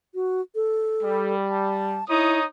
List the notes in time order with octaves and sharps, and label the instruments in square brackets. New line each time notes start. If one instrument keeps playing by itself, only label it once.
[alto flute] F#4
A4
[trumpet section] G3
[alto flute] A5
[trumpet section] D#4 C#5 D#6 [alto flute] E4